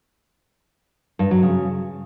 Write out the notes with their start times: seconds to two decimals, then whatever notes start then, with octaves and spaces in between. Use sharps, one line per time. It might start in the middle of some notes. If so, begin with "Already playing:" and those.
1.19 G2
1.31 F#3
1.43 C#3